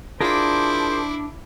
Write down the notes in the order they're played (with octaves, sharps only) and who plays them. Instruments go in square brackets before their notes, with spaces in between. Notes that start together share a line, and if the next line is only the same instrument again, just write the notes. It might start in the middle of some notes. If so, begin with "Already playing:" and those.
[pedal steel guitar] D4 [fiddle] E4 D6 [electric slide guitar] F4 G#4 A#4 [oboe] C5